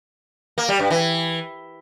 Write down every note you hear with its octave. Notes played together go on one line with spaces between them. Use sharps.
A#3
G3
G2
E3